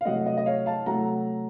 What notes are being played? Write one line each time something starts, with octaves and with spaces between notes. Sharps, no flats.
F5
C3 F#3 A3 D#5 F#5
D#5
D#5
C#5 F5
F5 A5
C3 F#3 A3 F#5 A#5